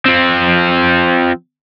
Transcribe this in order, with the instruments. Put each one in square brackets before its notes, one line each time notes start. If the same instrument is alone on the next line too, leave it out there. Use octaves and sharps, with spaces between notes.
[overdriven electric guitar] F3 C4